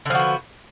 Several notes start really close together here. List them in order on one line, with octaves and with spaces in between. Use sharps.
D3 F3 F#4 B3